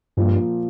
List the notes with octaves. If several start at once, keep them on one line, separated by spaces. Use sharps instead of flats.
G2 A#2 F3 A#3